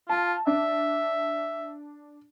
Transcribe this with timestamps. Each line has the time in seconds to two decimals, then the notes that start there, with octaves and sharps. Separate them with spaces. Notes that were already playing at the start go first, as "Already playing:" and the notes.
0.09 F4 A5
0.47 D4 E5